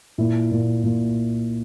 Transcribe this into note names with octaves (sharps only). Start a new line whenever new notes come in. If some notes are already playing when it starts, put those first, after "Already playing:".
A#2 E4
A#2
A#2